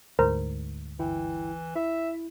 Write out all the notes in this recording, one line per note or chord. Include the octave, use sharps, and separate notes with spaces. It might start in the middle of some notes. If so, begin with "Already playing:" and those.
D2 G#2 A#4 C5 A#5
G1 E3 E4 G5
E4 E5